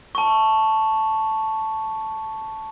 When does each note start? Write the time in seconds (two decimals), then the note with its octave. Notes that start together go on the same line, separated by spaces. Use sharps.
0.15 A5 C#6